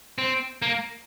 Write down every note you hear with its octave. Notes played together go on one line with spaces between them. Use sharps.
C4
A#3